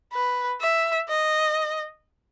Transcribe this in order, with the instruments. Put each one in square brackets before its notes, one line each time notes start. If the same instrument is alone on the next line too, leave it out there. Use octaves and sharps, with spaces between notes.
[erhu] B4
E5
D#5